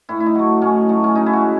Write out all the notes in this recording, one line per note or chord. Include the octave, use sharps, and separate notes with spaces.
A2 E4
E4
D#4
F#3 A3
A2 C#4
F#3 A3
C#4
C#3 D#4
E4
F#4
G#3